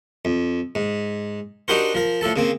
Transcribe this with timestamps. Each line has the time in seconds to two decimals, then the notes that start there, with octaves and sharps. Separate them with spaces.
0.25 F2
0.75 G#2
1.68 D4 D#4 F#4 G4 A#4 C5
1.94 F3 A#4
2.21 A2 F3 A4 A5
2.36 C#3 A#3 C4